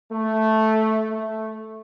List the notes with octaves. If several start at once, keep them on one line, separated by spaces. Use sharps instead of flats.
A3
A3